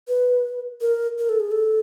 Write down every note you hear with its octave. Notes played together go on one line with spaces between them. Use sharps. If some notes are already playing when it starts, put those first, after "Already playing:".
B4
A#4
A#4
A4
G#4
A4